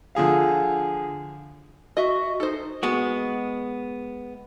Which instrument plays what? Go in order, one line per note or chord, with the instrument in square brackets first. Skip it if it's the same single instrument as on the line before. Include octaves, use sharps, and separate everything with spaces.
[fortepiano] D3 F3 G#4 F5
[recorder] F#4 [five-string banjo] D#5 E5
[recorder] D#4 [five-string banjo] A4 C5
[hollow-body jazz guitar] G#3 B3 F#4